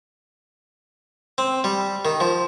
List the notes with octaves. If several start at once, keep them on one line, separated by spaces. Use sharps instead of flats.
C4
G3
D#3
F3